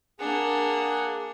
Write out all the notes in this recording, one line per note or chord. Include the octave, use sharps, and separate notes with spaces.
A#3 D4 G#4 F#5